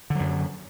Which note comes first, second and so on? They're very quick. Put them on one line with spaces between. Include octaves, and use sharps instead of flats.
D3 F#3 F#2